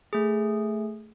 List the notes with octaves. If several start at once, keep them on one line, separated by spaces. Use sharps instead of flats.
A3 G#4